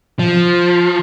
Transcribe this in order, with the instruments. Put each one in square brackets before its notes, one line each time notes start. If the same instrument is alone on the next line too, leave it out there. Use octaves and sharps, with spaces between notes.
[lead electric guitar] F3